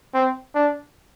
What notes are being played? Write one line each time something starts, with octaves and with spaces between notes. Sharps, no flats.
C4
D4